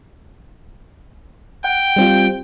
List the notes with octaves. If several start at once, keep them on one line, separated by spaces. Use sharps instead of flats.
F#5 G5
G3 C4 F4